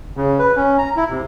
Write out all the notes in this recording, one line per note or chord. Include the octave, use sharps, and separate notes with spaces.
C#3
B4
C#4
A#5
E4
C3